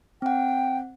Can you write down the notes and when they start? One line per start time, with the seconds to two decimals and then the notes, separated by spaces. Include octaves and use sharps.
0.22 C4 F#5 G5